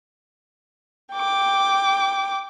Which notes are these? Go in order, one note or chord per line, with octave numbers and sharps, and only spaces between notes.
G5 D6